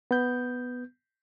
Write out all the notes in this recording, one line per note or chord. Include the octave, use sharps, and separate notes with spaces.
B3 G6